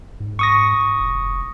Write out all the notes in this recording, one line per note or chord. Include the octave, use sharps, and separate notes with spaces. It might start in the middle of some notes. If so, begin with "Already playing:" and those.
G#2
C#6 D#6 A#6
F1